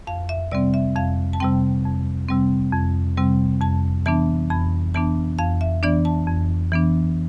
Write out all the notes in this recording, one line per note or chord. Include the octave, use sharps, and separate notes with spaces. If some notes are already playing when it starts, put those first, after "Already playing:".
F2 F5
E5
C3 G3 C4 D5
E5
F2 F5
A5
C3 G3 C4 G5
F2
C3 G3 C4
F2
C3 G3 C4
F2 A5
E3 B3 D4 A5
F2 B5
E3 B3 D4 A5
F2 F5
E5
E3 B3 D4 D5
A5
F2
E3 B3 D4